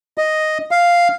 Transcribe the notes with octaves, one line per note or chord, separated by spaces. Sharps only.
D#5
F5